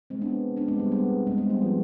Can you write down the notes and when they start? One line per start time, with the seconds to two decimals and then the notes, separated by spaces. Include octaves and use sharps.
0.10 G#3 C4
0.21 B3 D4
0.57 B3 D4
0.68 G#3 C4
0.80 G3 B3
0.92 G3 B3
1.27 G#3 C4
1.38 G#3
1.50 G3 B3
1.62 F3